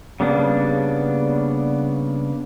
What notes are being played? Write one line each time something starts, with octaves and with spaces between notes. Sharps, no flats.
C#3 G3 A#3 B3 D4